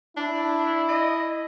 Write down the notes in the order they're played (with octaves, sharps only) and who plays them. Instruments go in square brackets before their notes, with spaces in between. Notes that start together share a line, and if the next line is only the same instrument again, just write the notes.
[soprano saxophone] D4 [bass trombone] E4
[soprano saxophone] D#5